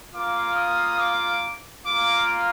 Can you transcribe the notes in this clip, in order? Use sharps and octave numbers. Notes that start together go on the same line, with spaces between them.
A#3 F4 D6
D#6
D6
A#3 F4 D6